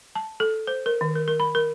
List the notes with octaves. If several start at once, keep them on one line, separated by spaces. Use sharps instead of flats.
A5
A4
C5
A#4
D#3
A#4
A#4
B5
A#4